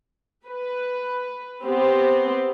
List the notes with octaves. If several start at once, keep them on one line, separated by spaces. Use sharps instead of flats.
B4
B3 C4 G4